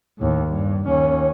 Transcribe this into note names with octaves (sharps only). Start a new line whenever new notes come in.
D#2 A2
G2
D#2 C#4